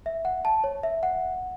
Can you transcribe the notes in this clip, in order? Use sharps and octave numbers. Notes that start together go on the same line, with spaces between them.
E5
F#5
A5
C#5
E5
F#5